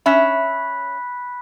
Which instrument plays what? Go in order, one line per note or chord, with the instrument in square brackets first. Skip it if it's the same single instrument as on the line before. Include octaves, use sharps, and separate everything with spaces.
[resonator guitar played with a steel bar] C#4 E5 [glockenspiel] B5 F#6 B6